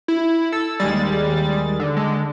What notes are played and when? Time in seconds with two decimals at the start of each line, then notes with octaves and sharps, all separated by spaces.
0.08 E4
0.52 A4 E6
0.80 D#2 G3 G#3 A6
1.79 D3
1.97 G#3